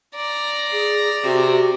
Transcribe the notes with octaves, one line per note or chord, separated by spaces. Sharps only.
D5 A#5
G#4
C3 F#4